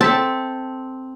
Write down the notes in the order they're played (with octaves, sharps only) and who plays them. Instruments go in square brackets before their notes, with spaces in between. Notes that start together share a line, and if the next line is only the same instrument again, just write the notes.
[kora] C4 [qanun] A4 E5 A5